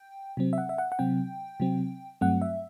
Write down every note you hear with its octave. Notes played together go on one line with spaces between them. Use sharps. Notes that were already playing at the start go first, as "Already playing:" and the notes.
Already playing: G5
C3 F#3 C4
E5
F#5
E5
F#5
F#5
C3 F#3 C4 G5
C3 F#3 C4
G2 F#3 A3 C4 F#5
E5